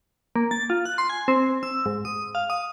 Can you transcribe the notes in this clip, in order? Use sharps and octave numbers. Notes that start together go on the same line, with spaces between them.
A#3
A6
F4
F#6
C6
G#5
C4
E6
G#2
D#6
F5
D#6